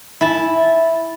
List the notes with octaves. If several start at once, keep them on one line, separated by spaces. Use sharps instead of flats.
E4 A5